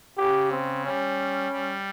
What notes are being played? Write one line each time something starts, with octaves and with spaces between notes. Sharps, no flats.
C#3 G4
C4
G3 C#4
G3